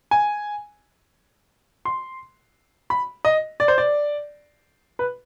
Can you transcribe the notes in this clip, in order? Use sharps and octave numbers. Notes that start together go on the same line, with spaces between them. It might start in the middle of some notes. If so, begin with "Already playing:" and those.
G#5
C6
B5
D#5
D5
C5
D5
B4